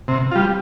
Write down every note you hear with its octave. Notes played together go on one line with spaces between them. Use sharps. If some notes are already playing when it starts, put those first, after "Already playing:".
C3
G3 F4